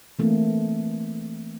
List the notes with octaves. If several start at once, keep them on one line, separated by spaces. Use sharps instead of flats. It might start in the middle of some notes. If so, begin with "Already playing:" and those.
E3 A3 A#3 C4